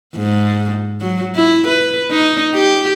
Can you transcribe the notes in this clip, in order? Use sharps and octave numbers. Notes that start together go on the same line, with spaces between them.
G#2
F#3
E4
B4
D#4
G4